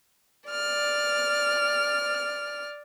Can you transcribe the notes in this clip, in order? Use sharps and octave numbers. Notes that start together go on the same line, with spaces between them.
D5 F6